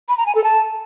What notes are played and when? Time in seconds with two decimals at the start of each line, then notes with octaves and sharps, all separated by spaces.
0.09 B5
0.18 A#5
0.26 G#5
0.35 A4
0.44 A5